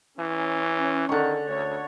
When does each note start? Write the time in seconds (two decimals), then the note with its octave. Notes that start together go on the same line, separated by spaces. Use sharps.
0.19 E3 C#4
1.09 D3 D#3 C#6
1.47 D2 C#5